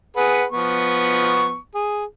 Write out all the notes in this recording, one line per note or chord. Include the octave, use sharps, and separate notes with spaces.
G#4 B4 F#5
F3 B3 C#6
G#4